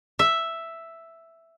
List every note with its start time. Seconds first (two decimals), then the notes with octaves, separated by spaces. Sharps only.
0.19 E5